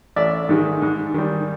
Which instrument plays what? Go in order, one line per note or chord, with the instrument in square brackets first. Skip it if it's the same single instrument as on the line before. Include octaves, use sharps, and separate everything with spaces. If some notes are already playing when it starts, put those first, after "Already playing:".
[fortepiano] A1 D5 E5
G#2 D#3 G#3
G#2
D#3 G3